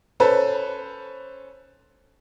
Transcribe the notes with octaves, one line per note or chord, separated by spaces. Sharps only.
C#4 A4 B4 C5